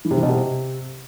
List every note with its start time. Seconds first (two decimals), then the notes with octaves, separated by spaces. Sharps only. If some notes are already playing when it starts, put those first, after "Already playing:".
0.05 E3
0.11 C3
0.17 E3
0.23 B2
0.29 C3